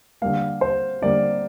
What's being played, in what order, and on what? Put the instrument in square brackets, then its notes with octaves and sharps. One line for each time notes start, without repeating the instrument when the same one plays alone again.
[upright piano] D3 G3 A#3 F5
C5
D3 G3 A#3 D5